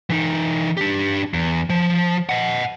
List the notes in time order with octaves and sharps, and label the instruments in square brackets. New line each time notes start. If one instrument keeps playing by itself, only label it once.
[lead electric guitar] E3 D#4
D4 G4
E2
F3
D#5 F#5